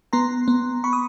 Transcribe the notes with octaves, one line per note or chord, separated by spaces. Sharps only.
B3 A#5 C6
B3
B5 C#6
D#6